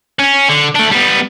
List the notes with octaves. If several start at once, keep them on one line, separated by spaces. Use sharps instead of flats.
C#4
D3
A3 D4
G3 B3